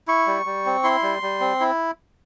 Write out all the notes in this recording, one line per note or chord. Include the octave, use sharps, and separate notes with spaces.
E4 C#6
G3
G3
C4
E4 C6
G3
G3
C4
E4